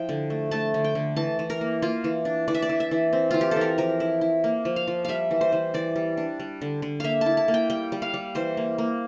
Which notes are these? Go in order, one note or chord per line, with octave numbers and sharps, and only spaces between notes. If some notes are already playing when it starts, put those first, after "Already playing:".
Already playing: F3 E4 G5
D3
A3
A3 A5
D3
G5
D3
E3 A5
E3
A#4
A#3
A#3 F4
E3
D4
E3 D5
E5
D5
E3
E5
E3
C4
E3 F4
G4
E3 A4
A#4
F3 A#4
E4
E4
A#3
F3
F5
F3
G3 E5 F5
E3
C5
E3
E3 D5
G3
D4
G3
D3
D3
A#3 E5 F5
E4 A5
A5
A#3
G5
G3 G5
G3
F5
G3
E3 C5
A#3
A#3